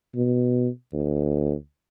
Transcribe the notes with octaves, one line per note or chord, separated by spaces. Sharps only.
B2
D2